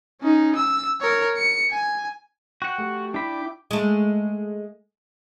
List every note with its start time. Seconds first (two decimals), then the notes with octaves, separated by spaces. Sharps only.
0.21 C#4 D#4
0.56 E6
1.01 A#4 C#5
1.37 C#7
1.70 G#5
2.62 F#4 F#5 G5
2.79 A3 G4
3.14 D4 E4 G5 B5 D6
3.71 G#3 A3